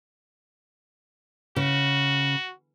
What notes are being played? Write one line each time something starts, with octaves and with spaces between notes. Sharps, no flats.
C#3 F#4